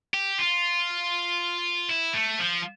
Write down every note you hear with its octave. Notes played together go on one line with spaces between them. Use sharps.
G4
F4
E4
A3
F3